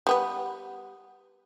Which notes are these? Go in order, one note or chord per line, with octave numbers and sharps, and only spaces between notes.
G3 B3 B4